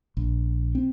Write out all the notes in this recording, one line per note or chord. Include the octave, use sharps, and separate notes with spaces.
A#1
C4